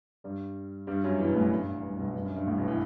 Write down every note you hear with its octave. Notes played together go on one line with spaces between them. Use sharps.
G2 G3
G2 G3
F#2 F#3
E2 E3
B2
A1 A2
F#2
G2
G2
B1 B2
G2
F#2
G2
A1 A2
B1 B2
E3